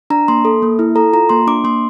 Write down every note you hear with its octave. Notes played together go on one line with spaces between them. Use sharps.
D4 A#5
A#3 C6
A4
A#3
E4
A4 A#5
F4 A#5
A#3 C6
D4 D6
A#3 C6